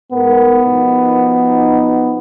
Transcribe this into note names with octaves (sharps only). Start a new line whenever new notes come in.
G#2 B3 A#4
B2 F3 D#4